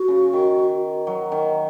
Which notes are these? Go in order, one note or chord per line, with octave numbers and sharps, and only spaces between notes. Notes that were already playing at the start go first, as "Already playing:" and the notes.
Already playing: F#4
C#3
D#3
F#3
D#3